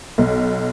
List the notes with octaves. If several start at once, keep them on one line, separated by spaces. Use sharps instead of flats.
B1